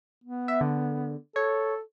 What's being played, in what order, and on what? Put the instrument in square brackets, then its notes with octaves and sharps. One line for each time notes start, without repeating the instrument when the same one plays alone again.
[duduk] B3
[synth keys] E5
D3
[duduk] A4 [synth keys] C#5